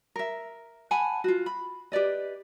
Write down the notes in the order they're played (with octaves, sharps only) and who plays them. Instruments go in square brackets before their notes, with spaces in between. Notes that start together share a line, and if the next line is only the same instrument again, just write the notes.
[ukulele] A#4 E5
F#5 G#5 A5 B5
F4 F#4
B5
G4 B4 D5 D#5